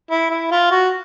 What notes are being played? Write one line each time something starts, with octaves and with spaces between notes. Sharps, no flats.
E4
E4
F4
F#4